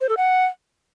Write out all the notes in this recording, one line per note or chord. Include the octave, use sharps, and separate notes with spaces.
C5
A4
F#5